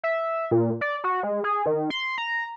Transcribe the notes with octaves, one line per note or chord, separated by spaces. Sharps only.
E5
A#2
D5
F#4
G#3
G#4
D#3
C6
A#5